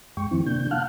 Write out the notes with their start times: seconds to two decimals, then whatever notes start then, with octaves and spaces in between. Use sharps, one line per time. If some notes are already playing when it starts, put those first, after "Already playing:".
0.17 F#2 G#3 G5 C#6
0.31 D#3 F3 C4 E4
0.46 C3 A#3 D4 G6
0.71 F5 F#5 A5 F6 F#6